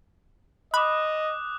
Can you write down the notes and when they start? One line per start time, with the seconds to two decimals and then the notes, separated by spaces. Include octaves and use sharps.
0.74 D#5 B5 D6 D#6 F#6